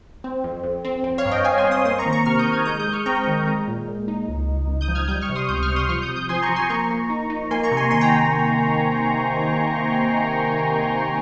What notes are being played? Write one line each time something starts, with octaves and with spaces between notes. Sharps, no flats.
C4
F2
F2
C4
C4
C#5 F5
G2
D#5 G5
C4 F5 G#5
G#5 C6
C4
C6 D#6
A#3 C6 D#6
A#5 C#6
D#3
A#5 C#6
C3 C#6 F6
D#6 G6
D#3
F6 G#6
G#3 D#6 G6
D#6 G6
G#3
C#6 F6
C4 G5 A#5
D#3
G#3
A#2
A#2
D#4
C#2
C#2
C#2
D#6 G6
F3
F6 G#6
G3 D#6 G6
C#6 F6
C3
C6 D#6
C#2 D#6 G6
C#6 F6
C3
C6 D#6
F3 C#6 F6
D#6 G6
C3
D#6 G6
F3 G#5 C6
A#5 C#6
F3
G#5 C6
A#3 A#5 C#6
A#3
D#4
D#4
A#3 G#5 C6
A#5 C#6
C3
G#5 C6
D#3 G#5 C6
G5 A#5